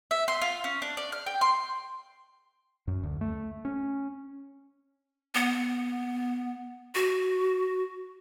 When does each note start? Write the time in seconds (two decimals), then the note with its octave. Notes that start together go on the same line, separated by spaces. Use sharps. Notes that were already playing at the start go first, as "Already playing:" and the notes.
0.11 E5
0.28 C6
0.42 F4
0.64 C#4
0.82 D4
0.97 D5
1.12 F6
1.26 G5
1.41 C6
2.87 F#2
3.03 D2
3.21 A3
3.65 C#4
5.35 B3
6.95 F#4